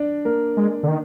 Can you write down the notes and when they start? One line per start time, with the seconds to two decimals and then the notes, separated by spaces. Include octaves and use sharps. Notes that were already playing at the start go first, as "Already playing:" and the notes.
Already playing: D4 D5
0.25 A#3 A#4
0.57 G#3
0.83 D3
0.88 D#3